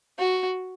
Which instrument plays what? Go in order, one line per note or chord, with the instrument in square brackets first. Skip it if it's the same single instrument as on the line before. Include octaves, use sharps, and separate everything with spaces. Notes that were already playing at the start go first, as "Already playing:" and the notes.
[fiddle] F#4